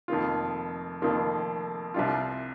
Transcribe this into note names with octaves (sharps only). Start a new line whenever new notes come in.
F1 F2 D#3 A#3 F4
F1 F2 D#3 A#3 F4
C2 C3 G3 D4 F4